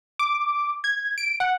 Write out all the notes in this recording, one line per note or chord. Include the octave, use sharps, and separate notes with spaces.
D6
G#6
D7
F#5